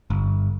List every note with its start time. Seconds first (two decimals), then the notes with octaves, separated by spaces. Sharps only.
0.10 G1